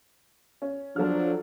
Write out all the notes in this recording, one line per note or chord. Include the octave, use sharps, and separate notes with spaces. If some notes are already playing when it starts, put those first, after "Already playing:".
C#4
F3 F#3 D4 A4 F6